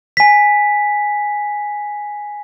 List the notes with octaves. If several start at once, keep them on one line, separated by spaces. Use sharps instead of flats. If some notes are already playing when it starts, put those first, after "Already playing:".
G#5 B6